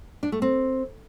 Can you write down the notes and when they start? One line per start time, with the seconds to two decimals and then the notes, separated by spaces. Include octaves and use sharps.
0.23 D4
0.32 A3
0.42 C4